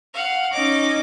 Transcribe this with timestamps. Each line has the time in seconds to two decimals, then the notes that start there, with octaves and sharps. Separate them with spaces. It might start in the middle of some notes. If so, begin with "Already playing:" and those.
0.14 F5 F#5
0.53 C#4 D#4 D6